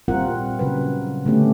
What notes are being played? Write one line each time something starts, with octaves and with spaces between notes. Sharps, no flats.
A#2 G3 C4 F4 A#4 F#5
C#3 F#3 B4
A#2 D3 A3 B3 C#4 G4